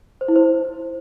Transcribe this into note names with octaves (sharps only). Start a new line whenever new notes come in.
C5
E4
C5